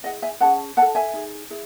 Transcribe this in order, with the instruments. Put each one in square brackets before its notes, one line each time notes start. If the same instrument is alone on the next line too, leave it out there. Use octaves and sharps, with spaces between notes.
[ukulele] E4 G#4 D#5 F#5
E5 G#5
C#4 G#4 F#5 A5
E4 F#5 A5
A4
E5 G#5
D#4 G#4
E4 G#4